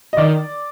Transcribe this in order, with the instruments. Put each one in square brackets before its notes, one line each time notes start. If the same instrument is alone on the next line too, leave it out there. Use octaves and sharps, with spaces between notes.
[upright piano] D#5
[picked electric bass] D#3 [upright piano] D5